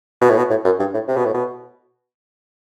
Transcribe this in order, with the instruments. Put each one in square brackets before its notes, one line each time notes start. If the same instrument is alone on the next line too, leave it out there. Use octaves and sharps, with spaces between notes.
[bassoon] B2
A2
B2
A2
F#2
G2
A2
C3
B2
A2
B2